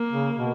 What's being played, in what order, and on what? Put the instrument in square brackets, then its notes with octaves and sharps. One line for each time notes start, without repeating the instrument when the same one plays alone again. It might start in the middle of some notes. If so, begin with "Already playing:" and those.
Already playing: [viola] A#3
[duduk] C#3
B2